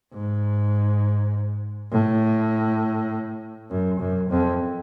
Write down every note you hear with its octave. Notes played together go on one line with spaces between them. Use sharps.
G#2
A2
F#2
F#2
F2